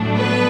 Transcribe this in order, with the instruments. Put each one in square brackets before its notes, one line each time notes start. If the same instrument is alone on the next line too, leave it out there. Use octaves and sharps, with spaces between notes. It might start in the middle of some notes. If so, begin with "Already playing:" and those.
Already playing: [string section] A2 F#3 A3 D4
B3 B4